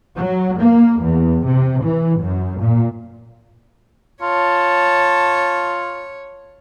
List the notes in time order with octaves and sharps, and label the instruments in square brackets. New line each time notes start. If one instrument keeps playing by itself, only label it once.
[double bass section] F#3
A#3
E2
C3
E3
F#2
A#2
[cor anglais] F4 [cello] C#5 [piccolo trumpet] A5